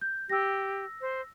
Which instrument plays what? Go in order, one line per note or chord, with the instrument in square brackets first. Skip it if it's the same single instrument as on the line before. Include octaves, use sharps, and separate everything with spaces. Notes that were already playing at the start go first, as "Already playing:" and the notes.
[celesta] G6
[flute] G4 [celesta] E6 A#6
[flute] C5